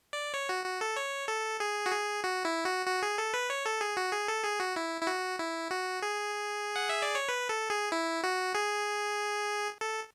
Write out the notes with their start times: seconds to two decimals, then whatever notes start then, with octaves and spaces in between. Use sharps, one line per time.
0.13 D5
0.34 C#5
0.49 F#4
0.65 F#4
0.81 A4
0.96 C#5
1.28 A4
1.60 G#4
1.86 F#4
1.92 G#4
2.24 F#4
2.45 E4
2.66 F#4
2.87 F#4
3.02 G#4
3.18 A4
3.34 B4
3.50 C#5
3.66 A4
3.81 G#4
3.97 F#4
4.13 G#4
4.28 A4
4.44 G#4
4.60 F#4
4.76 E4
5.01 E4
5.07 F#4
5.39 E4
5.71 F#4
6.02 G#4
6.76 F#5
6.89 E5
7.02 D5
7.15 C#5
7.29 B4
7.49 A4
7.70 G#4
7.92 E4
8.24 F#4
8.55 G#4
9.81 A4